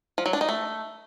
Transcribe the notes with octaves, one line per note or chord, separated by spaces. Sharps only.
F3
F#3
D4
D#4
A3